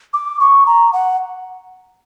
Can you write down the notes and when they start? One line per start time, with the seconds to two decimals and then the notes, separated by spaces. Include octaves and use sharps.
0.13 D6
0.40 C#6
0.66 A#5
0.93 F#5